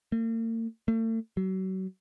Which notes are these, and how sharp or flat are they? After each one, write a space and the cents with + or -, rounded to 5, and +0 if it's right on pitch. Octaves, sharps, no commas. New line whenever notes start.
A#3 -45
A3 +40
F#3 +35